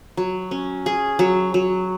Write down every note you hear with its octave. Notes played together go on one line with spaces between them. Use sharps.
F#3
C#4
G#4
F#3
F#3